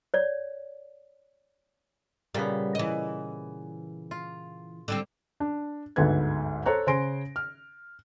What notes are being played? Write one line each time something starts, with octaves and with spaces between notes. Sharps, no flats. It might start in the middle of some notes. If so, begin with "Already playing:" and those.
C#5 D5
A#2 C#3 G3 B3
E3 D#5
F4
D3 G3 C4
D4
G1 D2 G#2 A4 B4 G#6
A4 C5 C#5 A#5 F#6
C#3 C5 G#5 C6 A#6 D7
F6